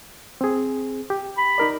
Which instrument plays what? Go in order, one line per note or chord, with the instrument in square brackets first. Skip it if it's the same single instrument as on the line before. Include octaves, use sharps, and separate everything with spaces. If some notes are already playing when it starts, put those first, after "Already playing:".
[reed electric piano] C4 G#4
G4
[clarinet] B5
[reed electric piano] D#4 A#4 D5